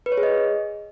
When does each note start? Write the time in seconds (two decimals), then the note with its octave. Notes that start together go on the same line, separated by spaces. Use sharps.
0.06 B4
0.12 C#5
0.17 G#4
0.23 D#5